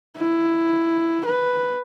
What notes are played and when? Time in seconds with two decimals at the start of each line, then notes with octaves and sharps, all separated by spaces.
0.18 E4
1.26 B4